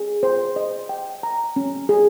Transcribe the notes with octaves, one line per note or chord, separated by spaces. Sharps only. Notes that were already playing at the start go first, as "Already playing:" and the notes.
Already playing: G#4
C5
D#5
G5
A#5
C#4
G#4